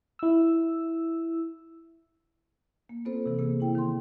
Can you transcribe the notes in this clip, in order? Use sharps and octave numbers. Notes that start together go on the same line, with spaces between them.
E4 E6
A#3
B3 C4 F4 A4 C5
C3 E3
C3 A#3 G#4
E4 G5
D#3 C6